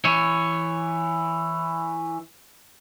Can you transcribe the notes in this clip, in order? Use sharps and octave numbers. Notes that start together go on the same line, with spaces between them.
E3 C#5